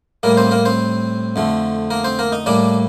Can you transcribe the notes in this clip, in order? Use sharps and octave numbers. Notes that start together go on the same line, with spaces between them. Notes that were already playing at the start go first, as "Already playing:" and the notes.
A2 G3 A#3 A#4
C4 C5
A#3 A#4
C4 C5
F2 D3 A3
A#3 A#4
C4 C5
A#3 A#4
D#4
A2 G3 A#3 D4 D5